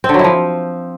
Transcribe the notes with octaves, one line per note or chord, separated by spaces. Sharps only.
C4
D3
F#3
E4
F3